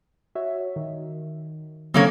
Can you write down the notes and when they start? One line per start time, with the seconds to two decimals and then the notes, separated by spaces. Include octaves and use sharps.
0.35 F#4 C#5 E5
0.76 D#3
1.94 C#3 F#3 A#3 C4 A4 C#5